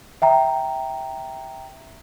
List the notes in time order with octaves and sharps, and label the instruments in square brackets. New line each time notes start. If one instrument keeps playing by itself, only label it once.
[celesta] E5 G5 A#5